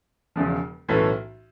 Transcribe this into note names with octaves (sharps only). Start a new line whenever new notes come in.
E1 E2 C#3 F3
B1 A2 E3 A3 C#4